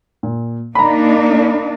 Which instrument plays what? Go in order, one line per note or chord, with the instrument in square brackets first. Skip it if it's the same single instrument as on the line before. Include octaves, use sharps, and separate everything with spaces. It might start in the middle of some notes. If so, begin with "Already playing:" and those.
[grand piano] A#2
[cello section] A#3 D4 D#4 [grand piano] A#5 B5